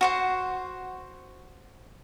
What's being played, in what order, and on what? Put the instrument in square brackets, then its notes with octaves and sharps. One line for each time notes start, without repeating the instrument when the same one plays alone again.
[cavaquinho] F#4 C5 F#5